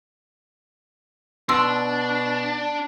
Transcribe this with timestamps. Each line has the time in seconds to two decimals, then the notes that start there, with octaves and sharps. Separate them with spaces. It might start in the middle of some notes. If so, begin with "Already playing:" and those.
1.49 B2 D4 C6 E6